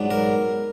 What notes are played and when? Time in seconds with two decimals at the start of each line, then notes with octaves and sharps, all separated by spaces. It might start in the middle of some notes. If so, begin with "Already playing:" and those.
Already playing: G#2 F#3 B3 D4
0.11 A#4